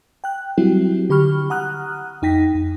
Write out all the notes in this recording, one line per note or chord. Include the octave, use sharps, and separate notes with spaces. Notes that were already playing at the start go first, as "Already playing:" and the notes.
G5 F#6
F#3 G3 C4 E4 F#4 G4
D3 G4 B5 C#6 F6
F#5 A#5 D#6 F6 F#6
F2 D#4 G5 A#6 B6
F2